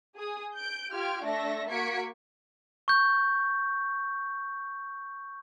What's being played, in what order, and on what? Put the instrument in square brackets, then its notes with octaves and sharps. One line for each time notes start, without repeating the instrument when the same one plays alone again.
[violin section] G#4 D#6
G6 D7
F4 G4 F6 G#6 D7
A3 D4 A4 E5 A#6
A#3 F#4 G#6 B6 C#7 D7
[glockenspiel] C#6 G6